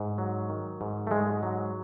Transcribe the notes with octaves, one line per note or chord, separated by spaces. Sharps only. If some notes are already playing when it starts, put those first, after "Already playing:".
Already playing: G#2
F#3
D#3
G#2
A3
G#2 G#3
F#3